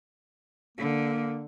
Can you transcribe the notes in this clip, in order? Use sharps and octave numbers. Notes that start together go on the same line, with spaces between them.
D3 A#3